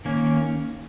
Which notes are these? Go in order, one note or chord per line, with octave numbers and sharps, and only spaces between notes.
D#3 A#3 C#4